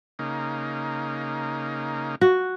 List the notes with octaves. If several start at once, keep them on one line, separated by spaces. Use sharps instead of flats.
C#3 A#3 D#4
F#4